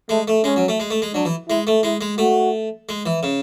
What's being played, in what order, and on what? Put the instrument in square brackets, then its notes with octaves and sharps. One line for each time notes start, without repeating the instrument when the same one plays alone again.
[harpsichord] G#3 [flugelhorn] A3
[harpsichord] A3
[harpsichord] G#3 [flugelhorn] C#4
[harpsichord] F#3
A3
G#3
A3
G#3
[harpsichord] F#3 [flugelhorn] D4
[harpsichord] E3
[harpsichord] G#3 [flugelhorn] E4
[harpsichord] A3
[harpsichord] G#3 [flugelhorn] E4
[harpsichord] G#3
[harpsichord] A3 [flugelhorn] F#4
[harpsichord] G#3
E3
C#3